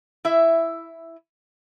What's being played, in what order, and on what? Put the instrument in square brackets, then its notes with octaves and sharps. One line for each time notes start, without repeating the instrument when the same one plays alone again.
[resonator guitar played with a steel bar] E4 E5